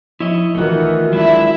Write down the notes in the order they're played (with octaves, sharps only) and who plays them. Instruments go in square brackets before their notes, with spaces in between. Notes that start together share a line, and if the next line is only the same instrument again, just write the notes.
[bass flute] F3 [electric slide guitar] E4 C#5 D#5
[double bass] D#3 E3 [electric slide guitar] A3 F#4 [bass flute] F4
[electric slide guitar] F#3 D4 [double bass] G#3 [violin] E4 E5